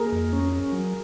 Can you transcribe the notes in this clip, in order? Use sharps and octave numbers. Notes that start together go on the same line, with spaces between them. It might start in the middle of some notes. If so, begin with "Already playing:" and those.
Already playing: A#3 G#4 A#4
F2
C#4
C#4
F#3